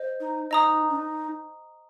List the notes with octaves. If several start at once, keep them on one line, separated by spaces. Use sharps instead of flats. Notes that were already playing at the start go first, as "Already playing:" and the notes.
Already playing: C5 D#5
D#4
D#4 D#5 A#5 D#6
D4
D#4